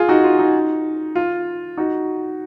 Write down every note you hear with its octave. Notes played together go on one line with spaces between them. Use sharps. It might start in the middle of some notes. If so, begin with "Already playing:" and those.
Already playing: F4 G#4
D#4 F#4
F4
D#4
F4
D#4 F#4